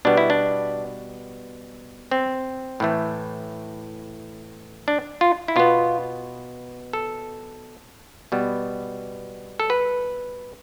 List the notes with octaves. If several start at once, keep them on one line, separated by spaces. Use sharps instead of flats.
B2 G3 B3 D4
E4
D4
C4
A2 E3 A3
D4
F4
E4
B2 B3 F4
A4
B2 G3 B3
A4
B4